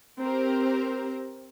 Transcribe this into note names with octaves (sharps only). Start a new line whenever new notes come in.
C4 G4 A#4 C5